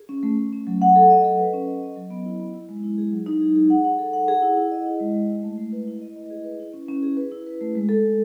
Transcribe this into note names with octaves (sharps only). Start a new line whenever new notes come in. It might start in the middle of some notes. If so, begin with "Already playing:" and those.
Already playing: G#4
C#4
A3
A3
C#4
F#3
F#5
A4
D#5
A4
B4
C#4
D#5
D#5
F#3
B3
E4
B3
E4
G#3
E4
G#4
F#3
D#4
G#4
G#4
F#5
F#5
A4
F#5
G#4
E4
E4
D#5
E4
G#3
G#3
E4
A3
A3
B4
E4
D#5
D#5
G#4
B4
E4
C#4
C#4
G#4
B4
E4
B4
A3
G#3
A4
G#3